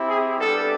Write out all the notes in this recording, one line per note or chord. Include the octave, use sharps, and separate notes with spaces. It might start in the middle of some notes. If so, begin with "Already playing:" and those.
Already playing: C4 E4 G4
G#4
G3 B3 D4 G4 A4